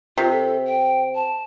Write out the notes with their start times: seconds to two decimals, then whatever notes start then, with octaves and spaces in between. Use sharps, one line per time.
0.18 C3 F4
0.32 A4
0.66 G5
1.15 A5